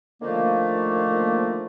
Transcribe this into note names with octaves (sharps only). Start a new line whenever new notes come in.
D3 D#3 F3 A3 A#3